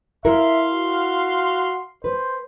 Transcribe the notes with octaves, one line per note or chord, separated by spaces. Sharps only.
E4 A#4 E5 F5 C6
F#4
B4 C5